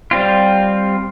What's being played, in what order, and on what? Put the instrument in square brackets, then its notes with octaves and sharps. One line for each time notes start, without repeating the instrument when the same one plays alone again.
[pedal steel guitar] G3 C4 F4